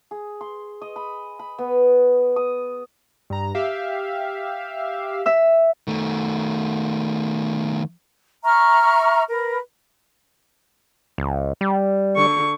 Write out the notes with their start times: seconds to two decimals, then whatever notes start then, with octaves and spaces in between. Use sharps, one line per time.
0.11 G#4
0.41 C6
0.82 D#5
0.96 B5
1.39 B5
1.58 B3
2.36 D#6
3.30 G2 A#5
3.55 G4 E5 F5
5.26 E5 E6
5.88 D#3 A3
8.44 E5 A#5 C#6 F6
9.30 A#4 B4
11.18 C#2
11.61 G3
12.16 D3 C#6